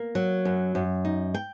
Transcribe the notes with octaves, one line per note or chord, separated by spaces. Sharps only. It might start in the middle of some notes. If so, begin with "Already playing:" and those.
Already playing: A#3
F#3
F#2
F#2
D#4
G5